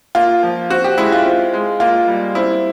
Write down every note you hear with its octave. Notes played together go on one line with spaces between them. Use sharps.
A#3 F4
F3
C4 F#4
G4
G#3 E4
F4
C4
G#3
A#3 F4
G3
C4 E4